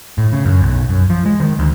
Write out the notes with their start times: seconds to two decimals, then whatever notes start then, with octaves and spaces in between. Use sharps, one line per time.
0.18 A2
0.32 C#3
0.45 F#2
0.62 B1
0.89 F#2
1.10 F3
1.26 G#3
1.40 D#3
1.59 D2